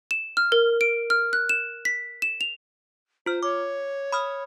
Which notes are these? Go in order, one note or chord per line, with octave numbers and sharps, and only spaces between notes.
E7
F6
A#4
D7
F6
F#6
E7
B6
E7
F7
F4 C5 F6
C#5 D6
B5 D#6 F6